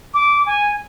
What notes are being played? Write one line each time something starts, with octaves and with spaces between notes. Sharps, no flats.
D6
G#5